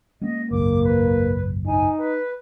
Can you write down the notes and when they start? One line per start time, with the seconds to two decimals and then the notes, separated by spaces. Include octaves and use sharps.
0.22 G#3 A#3 C#4 D#5
0.51 F#1 B1 G#2 A#3 D6
0.84 B4
1.66 D#4 G#5
1.98 B4